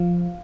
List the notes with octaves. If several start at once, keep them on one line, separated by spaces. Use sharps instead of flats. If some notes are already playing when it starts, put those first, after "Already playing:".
Already playing: F3 F5